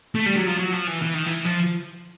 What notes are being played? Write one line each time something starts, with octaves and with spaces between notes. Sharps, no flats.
A3
G3
F#3
F3
F#3
F3
E3
E3
D#3
E3
F3